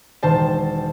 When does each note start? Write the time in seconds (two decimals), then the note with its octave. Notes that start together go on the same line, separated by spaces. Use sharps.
0.23 E1 D#3 C5 A5